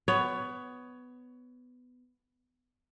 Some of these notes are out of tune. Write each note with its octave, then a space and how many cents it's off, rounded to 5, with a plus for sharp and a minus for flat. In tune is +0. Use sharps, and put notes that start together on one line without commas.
B3 +15 C#5 +20